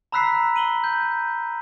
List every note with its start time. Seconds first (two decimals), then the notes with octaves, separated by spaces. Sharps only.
0.12 A#5 B5 E6 F#6 B6 C7
0.56 D#7 F#7 G7
0.84 G6